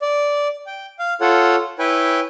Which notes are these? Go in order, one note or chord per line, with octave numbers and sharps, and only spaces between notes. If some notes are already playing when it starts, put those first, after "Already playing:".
D5
G5
F5
F4 A4 C#5 F#5
E4 B4 C#5 G5 G#5